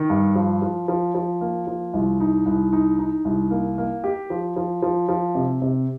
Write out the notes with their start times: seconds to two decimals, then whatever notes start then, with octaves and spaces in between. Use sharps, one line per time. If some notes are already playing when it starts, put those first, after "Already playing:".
Already playing: D#3
0.10 G2
0.36 F3
0.62 F3
0.88 F3
1.15 F3
1.41 A#3
1.67 F3
1.94 C2
2.20 D#4
2.46 C2
2.73 D#4
2.99 D#4
3.25 C2
3.51 A#3
3.78 A#3
4.04 G4
4.30 F3
4.56 F3
4.82 F3
5.09 F3
5.35 C3
5.62 C3